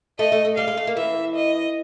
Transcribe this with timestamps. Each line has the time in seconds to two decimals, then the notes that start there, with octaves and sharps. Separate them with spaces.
0.19 A3 D#5
0.32 A3
0.45 A3
0.57 G3 F5
0.67 G#3
0.77 A3
0.87 A#3
0.97 E3 E5
1.35 D#5